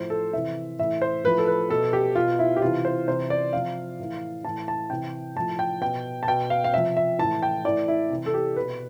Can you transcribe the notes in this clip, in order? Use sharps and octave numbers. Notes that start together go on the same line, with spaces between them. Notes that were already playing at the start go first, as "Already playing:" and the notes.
Already playing: A2 F3 C5
A4
C3 E3 E5
A2 E3 E5
C5
A2 F3 B4
A4
B4
B2 A4
G4
B2 F4
E4
G4
C3 E3 F4
C5
C3 E3 C5
D5
C3 F3 F5
A2 E3
A2 E3 A5
A5
C3 E3 G5
A2 F3 A5
G5
B2 G5
A5
B2 G5
F5
F5
C3 F3 E5
E5
A2 E3 A5
G5
A2 E3 D5
E4
C3 E3
A4
G4
B2 B4